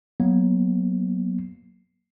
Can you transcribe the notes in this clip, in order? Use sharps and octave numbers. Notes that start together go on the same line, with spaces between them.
F#3 A#3 B3